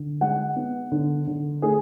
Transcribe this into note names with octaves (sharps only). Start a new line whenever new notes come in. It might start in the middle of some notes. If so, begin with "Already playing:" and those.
Already playing: D3
G#3 F#5
B3
D3
D3
A3 G#4